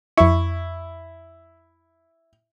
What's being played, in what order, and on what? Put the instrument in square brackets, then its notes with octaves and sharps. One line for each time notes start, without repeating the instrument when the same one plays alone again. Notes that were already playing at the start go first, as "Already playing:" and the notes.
[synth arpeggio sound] F2 C#6 [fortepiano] E4